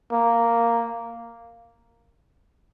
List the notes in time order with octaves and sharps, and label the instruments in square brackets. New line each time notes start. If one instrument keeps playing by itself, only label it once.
[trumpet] A#3